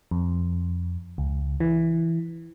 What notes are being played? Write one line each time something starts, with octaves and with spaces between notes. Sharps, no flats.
F2
C#2
E3